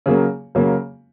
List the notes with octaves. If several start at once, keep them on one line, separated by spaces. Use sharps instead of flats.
C#3 F#3 A#3
C#3 F#3 A#3